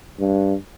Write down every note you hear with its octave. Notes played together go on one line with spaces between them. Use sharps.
G2